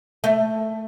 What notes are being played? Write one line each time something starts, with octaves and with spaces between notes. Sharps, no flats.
A3